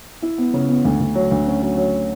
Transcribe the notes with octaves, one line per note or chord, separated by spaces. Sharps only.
E4
B3
C#3
B3
D2
D2
F#3
D2
C#4
F#3
F#3